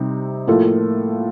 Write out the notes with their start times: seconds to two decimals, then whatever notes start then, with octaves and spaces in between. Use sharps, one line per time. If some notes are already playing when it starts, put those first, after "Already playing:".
Already playing: C3 G3 C4 D#4
0.47 A2 F3 A#3 F4 A4